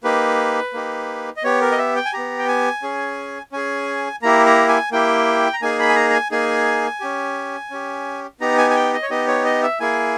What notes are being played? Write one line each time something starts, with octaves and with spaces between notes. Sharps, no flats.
A#3 D#4 G4 B4
A#3 D#4 G4
D#5
B3 G4 C#5
A#4
D#5
E5
G5
G#5
B3 G4 A#5
G5
G#5
C#4 G#4
C#4 G#4 G#5
A#3 E4 G4 A#5
A#5
G#5
A#3 E4 G4 G5
A#5
A#3 D#4 G#4 G#5
B5
G#5
A#5
A#5
G#5
A#3 D#4 G#4 G#5
C#4 G4
C#4 G4
B3 D#4 G4 A#5
G#5
G#5
G5
D#5
C#5
B3 D#4 G4 D#5
C#5
D#5
E5
A#3 E4 G#4 G#5